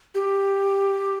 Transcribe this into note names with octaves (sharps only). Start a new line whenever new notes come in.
G4